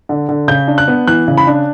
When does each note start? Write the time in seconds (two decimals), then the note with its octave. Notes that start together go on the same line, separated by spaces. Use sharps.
0.09 D3
0.29 D3
0.48 C#3 G6
0.67 D4
0.78 F#6
0.88 B3
1.07 E3 F#6
1.28 C#3
1.38 B5
1.47 D4